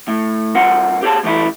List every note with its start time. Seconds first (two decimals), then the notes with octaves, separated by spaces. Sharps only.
0.08 A2
0.55 G2 C4 F4 A#4 F#5
1.03 G4 G#4 C#5 A5
1.23 A2 E3 G3 A3 E4